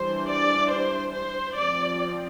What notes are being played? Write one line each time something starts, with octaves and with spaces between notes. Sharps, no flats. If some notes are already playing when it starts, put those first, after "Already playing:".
Already playing: E3 G3 D4 C5
D5
C5
C5
F3 C4 D5